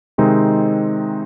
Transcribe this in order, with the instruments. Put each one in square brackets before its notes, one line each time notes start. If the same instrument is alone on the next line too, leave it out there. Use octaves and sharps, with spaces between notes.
[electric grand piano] C3 D#3 G#3 C4 D#4